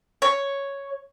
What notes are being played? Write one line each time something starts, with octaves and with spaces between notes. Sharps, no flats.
C#5